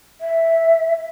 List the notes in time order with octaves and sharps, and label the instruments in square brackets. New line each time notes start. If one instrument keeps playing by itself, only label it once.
[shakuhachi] E5